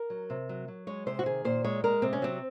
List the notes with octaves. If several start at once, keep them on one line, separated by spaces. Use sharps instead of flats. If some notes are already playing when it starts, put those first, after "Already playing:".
Already playing: A#4
F#3
C3
F#3
F#3
G#3 C#5
C3 C5
F#4
D#3 G#4
A#2 C5
G#3 C#5
G#3 A#4
C3 C4
C#4
F#3 C4